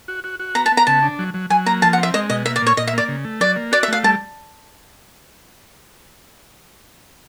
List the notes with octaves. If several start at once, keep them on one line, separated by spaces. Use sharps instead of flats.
F#4
F#4
F#4
B3 A#5
A5
B3
A#5
C#3 A5
D4
F#3
F#3
F#3 G#5
A#3 A#5
F3 A5
F#5
C4
E5
G#3 D#5
B2 D#5
A#3 E5
D5
A#2 C#5
A#2 D#5
E5
A#3 D5
C#3
A3
F#3 D5
A#3
F#4 D5
E5
A3 F5
G3 A5